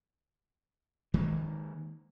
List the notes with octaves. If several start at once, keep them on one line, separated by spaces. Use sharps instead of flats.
D#3 G#3 A#3